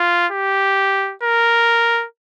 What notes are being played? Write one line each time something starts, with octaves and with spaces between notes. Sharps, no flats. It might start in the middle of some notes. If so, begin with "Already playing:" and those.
Already playing: F4
G4
A#4